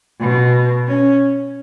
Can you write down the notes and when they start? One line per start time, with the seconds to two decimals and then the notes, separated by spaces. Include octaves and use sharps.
0.20 B2
0.88 C#4